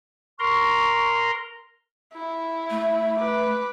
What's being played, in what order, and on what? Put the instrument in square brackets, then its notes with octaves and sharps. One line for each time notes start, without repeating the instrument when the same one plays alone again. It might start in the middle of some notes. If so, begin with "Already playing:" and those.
[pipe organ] A#4 A#5 C6 [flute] C#6
[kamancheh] E4
[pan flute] A3
[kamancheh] B4 D6